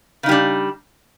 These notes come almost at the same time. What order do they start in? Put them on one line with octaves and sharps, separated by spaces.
C#3 D#4 G3 D4